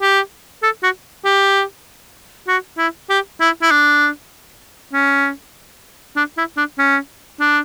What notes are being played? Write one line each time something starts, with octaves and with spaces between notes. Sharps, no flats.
G4
A4
F#4
G4
F#4
E4
G4
E4
E4
D4
C#4
D4
E4
D4
C#4
D4